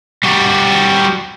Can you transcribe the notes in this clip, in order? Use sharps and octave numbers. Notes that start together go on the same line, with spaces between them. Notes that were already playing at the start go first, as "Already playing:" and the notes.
G3 F#4